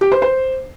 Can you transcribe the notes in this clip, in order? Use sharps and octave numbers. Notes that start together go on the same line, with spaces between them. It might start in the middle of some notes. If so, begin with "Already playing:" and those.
G4
C5
C5